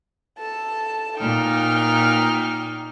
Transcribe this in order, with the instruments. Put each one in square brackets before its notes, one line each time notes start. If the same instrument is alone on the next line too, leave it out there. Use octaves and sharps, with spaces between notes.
[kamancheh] A4 A5
[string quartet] A#2 D#4 [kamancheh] G5 F6